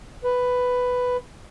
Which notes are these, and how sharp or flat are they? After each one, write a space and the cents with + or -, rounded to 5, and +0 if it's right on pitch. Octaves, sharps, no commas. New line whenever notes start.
B4 +5